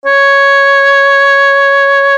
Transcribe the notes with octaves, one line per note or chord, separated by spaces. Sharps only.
C#5